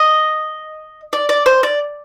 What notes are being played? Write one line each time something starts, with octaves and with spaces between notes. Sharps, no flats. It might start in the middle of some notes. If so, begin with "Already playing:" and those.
Already playing: D#5
D5
D5
C5
D5